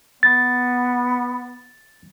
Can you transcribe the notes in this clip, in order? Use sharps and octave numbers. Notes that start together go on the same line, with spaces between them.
B3 A6